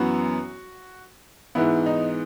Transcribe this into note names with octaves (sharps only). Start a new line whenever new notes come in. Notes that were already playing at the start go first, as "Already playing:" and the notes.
Already playing: F#2 E3 B3 F#4
G#2 E3 B3 E4
D#4